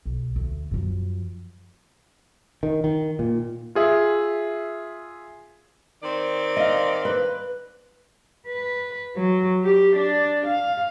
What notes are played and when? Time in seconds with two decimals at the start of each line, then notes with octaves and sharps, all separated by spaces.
0.06 B1
0.36 D2
0.71 F#2 F3
2.63 D#3
2.84 D#3
3.19 A#2
3.75 F4 G#4 E5
6.03 D#3 C4 D5
6.57 D#5 F5
7.05 B4
8.47 B4
9.16 F#3
9.64 G4
9.95 D4
10.46 F5